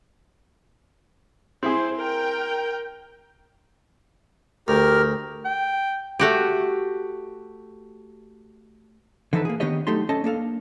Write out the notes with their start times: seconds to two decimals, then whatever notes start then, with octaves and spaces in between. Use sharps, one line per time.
1.63 C4 E4 G#4 C5
1.96 A#4 G5
4.68 D2 G4 A#4 F6
5.45 G5
6.19 A3 F#4 G4
9.33 D3 E3 F3 D#4 A4 B4
9.45 A#3 G#4
9.60 D#3 B3 D4 G4 C#5 D#5
9.87 F#3 A3 D#4 G4 A4 C6
10.09 C#4 A4 D#5 A5
10.24 A#3 D4 A4 F5